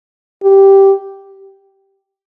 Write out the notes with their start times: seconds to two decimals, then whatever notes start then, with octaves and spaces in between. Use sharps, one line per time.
0.43 G4